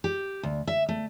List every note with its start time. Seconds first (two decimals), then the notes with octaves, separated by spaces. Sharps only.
0.04 G4
0.43 D2
0.67 E5
0.89 A3